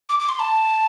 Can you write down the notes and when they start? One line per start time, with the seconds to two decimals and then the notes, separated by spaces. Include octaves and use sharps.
0.09 D6
0.19 D6
0.29 C6
0.39 A5